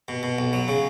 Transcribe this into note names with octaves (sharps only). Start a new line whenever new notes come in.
B2
B2
B1
F#3
C#3